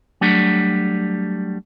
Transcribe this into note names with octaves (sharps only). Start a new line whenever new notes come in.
F#3 G3 A3 D4